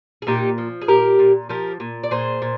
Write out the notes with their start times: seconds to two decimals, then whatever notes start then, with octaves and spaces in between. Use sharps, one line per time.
0.22 G#4
0.27 A#2 D#4 G4
0.58 F3
0.82 G#4
0.88 A#2 G4 A#4
1.19 A#2
1.49 F3 G4 A#4
1.80 A#2
2.03 D5
2.11 A#2 G#4 C5
2.42 A#2